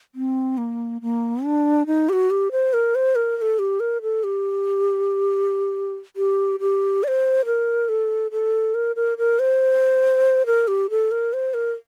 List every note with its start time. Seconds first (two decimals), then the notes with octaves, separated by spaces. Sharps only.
0.15 C4
0.58 A#3
1.02 A#3
1.44 D4
1.87 D#4
2.09 G4
2.13 F#4
2.30 G4
2.52 C5
2.73 A#4
2.95 C5
3.15 A#4
3.37 A#4
3.42 A4
3.59 G4
3.80 A#4
4.02 A4
4.24 G4
6.16 G4
6.60 G4
7.04 D5
7.08 C5
7.45 A#4
7.89 A4
8.32 A4
8.74 A#4
8.96 A#4
9.18 A#4
9.39 C5
10.46 A#4
10.68 G4
10.90 A4
11.11 A#4
11.33 C5
11.54 A#4